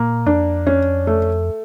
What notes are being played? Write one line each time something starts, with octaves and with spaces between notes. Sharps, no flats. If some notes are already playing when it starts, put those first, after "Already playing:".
Already playing: A#2 A#3
F2 D4
C#4
A3